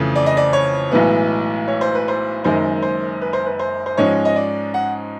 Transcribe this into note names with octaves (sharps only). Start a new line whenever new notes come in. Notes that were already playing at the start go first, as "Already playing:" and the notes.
Already playing: F2 C#3 E3 A3
D5
D#5
D5
C#5
B1 A2 E3 G#3 B3
C#5
C5
B4
C5
F#1 F#2 D#3 G#3 C5
C5
B4
C5
B4
C5
C5
G#2 F3 G#3 C#4 C#5
D#5
D5
F#5